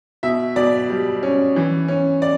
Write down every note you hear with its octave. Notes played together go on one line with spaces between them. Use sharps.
B2 E5
B2 D5
G3
C#4
E3
C#4
D5